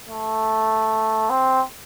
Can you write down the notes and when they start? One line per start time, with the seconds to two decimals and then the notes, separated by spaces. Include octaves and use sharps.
0.09 A3
1.30 C4